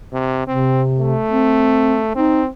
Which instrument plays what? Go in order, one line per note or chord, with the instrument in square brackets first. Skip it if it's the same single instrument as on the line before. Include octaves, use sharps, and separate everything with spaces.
[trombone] C3
[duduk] C3 [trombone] C4
[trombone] A3
[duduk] C4
[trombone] C4 [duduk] D#4